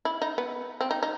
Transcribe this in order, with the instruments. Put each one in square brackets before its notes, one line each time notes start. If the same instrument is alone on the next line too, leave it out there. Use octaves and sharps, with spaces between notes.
[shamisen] E4
D#4
B3
C4
D#4
D#4